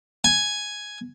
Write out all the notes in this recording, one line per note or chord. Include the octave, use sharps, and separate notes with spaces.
G#5